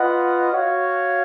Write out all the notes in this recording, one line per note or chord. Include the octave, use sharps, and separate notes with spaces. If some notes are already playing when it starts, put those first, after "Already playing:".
Already playing: F4 B4 D#5 F#5
F#4 C#5 F5